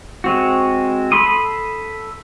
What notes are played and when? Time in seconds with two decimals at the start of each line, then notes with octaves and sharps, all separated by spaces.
0.24 G#3 C4 F#4
1.12 A4 B5 C6 D#6